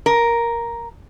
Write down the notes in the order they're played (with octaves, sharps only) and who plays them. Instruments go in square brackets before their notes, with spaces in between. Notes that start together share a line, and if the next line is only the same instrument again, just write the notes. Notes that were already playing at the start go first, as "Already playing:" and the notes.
[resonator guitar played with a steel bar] A#4